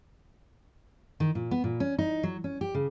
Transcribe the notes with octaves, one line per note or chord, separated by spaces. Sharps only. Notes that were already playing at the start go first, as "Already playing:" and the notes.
D#3
A#2
B3
A#2
C#4
D#4
F#3
C#4
G4
C#3